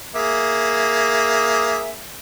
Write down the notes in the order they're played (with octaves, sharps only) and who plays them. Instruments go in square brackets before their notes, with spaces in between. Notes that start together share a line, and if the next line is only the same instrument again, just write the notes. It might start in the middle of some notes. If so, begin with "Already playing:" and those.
[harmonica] A#3 G#4 E5